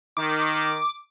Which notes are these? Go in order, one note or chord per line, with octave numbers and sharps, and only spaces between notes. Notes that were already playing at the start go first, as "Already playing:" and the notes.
D#3 D6